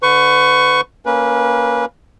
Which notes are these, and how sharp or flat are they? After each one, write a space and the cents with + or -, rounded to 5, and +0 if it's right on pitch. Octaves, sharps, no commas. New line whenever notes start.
D3 +0 B4 +35 C#6 +0
A#3 +0 C#4 +0 B4 -20